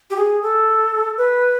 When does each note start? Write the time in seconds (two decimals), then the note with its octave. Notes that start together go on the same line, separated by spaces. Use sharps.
0.10 G4
0.16 G#4
0.42 A4
1.17 B4